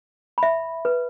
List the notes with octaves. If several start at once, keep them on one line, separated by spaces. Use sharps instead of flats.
E5 B5
B4